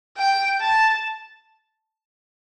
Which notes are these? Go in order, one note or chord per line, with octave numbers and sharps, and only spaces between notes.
G5
A5